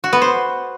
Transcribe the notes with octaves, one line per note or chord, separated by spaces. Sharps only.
F#4
B3
C5